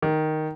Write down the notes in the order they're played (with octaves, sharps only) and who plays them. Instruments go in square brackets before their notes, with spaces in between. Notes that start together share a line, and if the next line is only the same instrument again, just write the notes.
[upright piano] D#3